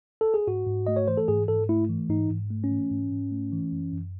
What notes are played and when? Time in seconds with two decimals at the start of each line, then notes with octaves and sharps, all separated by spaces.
0.21 A4
0.34 G#4
0.47 G#2 F#4
0.67 G#2
0.87 A3 D#5
0.96 C#5
1.08 E3 C5
1.17 A4
1.28 G#2 G#4
1.48 G#2 A4
1.69 A3 E4
1.89 E3
2.09 G#2 D#4
2.30 G#2
2.50 A3
2.64 C#4
2.71 E3
2.91 G#2
3.11 G#2
3.31 A3
3.53 E3
3.72 F#2
3.93 F#2